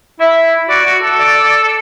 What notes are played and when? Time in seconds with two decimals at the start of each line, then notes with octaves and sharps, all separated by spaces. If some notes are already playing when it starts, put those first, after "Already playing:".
0.20 E4 E5
0.69 F#4 D5
0.85 F#4
1.02 A4
1.18 D5